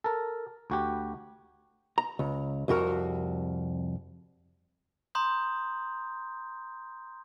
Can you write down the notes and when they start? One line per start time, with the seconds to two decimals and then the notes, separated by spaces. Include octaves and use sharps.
0.04 A4 A#4
0.70 D2 F#4 G4
1.98 A#5
2.19 C#2
2.68 C2 F2 F#4 A#4
5.15 A#5 C6 D#6 G6